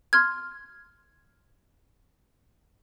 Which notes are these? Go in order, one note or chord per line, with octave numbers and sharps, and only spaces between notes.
C6 F6 G#6